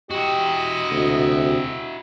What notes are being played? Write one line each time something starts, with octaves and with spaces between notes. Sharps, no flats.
E4 F#4 G4 D#5
D2 C3